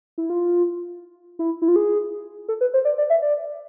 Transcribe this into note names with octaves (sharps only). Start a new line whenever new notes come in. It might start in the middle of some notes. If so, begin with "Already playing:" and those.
E4
F4
E4
E4
F4
G#4
A4
B4
C5
D5
D5
E5
D5